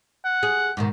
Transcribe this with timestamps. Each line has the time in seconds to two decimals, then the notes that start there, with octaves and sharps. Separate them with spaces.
0.24 F#5
0.43 G#4
0.77 G#2 B2 D#3